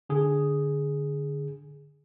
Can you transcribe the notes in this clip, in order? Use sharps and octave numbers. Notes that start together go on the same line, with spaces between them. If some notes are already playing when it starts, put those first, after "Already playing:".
D3 G#4